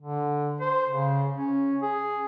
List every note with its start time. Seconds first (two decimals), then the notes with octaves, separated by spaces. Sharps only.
0.01 D3
0.61 C5
0.89 C#3
1.38 C#4
1.82 G#4